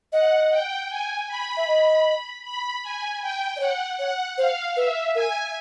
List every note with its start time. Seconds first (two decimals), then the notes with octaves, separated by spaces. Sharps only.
0.12 D#5 F#5
0.51 G5
0.89 G#5
1.28 B5
1.57 E5
1.67 D#5
2.44 B5
2.83 G#5
3.22 G5
3.56 D5
3.60 C#5 F#5
3.99 C#5 F#5
4.37 C5 F5
4.76 B4 E5
5.15 A#4 G#5